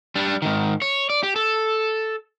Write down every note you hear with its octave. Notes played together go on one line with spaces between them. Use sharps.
G3 D4
G#2 D#3
C#5
D5
G4
A4